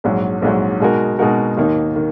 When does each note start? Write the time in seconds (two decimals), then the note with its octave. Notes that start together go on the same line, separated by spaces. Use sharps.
0.04 A#1 G#2 F#3
0.42 A#1 G#2 F#3
0.80 B2 G#3 D#4 F#4 A#4
1.19 B2 G#3 D#4 F#4 A#4
1.57 D#2 D#3 A#3 D#4
1.96 D#3